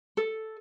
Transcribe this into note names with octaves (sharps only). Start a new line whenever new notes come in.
A4